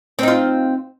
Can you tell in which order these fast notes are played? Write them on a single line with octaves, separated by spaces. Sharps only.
C4 D#4 F4